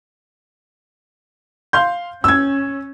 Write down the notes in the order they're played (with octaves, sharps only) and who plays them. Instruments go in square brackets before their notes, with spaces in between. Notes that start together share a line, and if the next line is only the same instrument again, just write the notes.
[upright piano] F5 C6 G6
[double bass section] C#4 [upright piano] E6 G#6